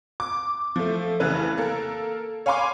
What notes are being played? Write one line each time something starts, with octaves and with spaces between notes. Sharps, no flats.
D6
F3 A3
F1 C#3 E3 B4
A#3 A4 A#4
C#5 F5 G#5 B5 C6 D6